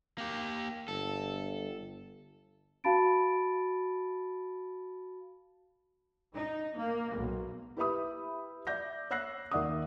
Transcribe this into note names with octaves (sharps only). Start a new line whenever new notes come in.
A#3 G4
G1 A4
F#4 F5 A5 B5 A6 D7
D#4
A#3
B1
E4 G4 B4 E5 B5 D#6
D5 E5 G6 A#6
C#5 E6 F#6 A#6 C7
D#2 D#3 D5 E5 F#5 D#6